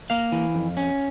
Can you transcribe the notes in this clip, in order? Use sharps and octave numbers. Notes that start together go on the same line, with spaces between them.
A#3 F5
E3
F2
C#4